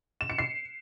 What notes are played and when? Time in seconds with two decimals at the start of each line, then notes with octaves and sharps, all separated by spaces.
0.21 E7
0.30 C#7
0.38 C7